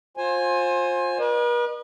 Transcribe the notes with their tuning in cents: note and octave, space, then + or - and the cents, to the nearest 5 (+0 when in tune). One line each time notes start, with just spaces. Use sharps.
F4 +30 C5 +25 G#5 +0
B4 -45 D#5 -45